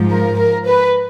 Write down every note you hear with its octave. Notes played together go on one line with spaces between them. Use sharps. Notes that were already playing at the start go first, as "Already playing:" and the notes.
Already playing: G#2 F3
A#4
A#4
B4